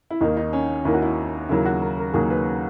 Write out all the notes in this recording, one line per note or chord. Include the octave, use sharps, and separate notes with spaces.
E4
D#2 D#3 A#3 D#4
D#4
C#4
D#2 D#3 A#3 E4
F#4
E4
D#2 C#3 F#3 A#3 E4
F#4
A#4
A#4
D#2 C#3 F#3 A#3 G#4
B4